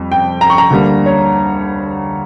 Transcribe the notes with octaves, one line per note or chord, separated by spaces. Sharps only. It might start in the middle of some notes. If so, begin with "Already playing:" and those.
Already playing: F2 G3
G5
A#5
C#6
A#5
D2 D3 G3 A#3
C#5